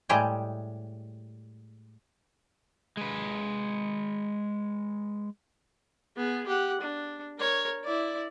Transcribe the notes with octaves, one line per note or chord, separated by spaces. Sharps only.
A2 G3 G#3 G4 G5 G#5
G#3 B4
B3 G#4
G4 F#5
D4
A#4 C#5
E4 D5